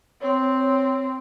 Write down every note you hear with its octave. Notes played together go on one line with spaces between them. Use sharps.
C4 C#5